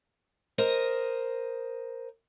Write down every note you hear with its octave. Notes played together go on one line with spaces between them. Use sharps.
A#4 C5 D#5